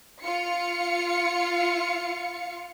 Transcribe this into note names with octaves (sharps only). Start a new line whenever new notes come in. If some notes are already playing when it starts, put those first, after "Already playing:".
F4 F5 C#7